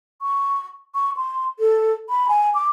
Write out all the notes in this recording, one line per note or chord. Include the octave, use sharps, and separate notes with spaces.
C#6
C#6
C6
A4
B5
G#5
D6